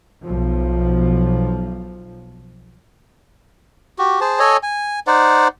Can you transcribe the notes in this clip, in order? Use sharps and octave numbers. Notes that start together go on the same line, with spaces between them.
B1 F3
F#4 G4
G#4 C5 A5
A4 C#5 D#5 G#5
G#5
D#4 C5 D5 F#5